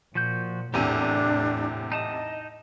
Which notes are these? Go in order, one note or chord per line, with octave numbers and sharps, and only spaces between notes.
A#2 F3 F#4 G6
E2 A2 C3 D4 A4 A#4 G#5
D#4 D#5 A5 D#6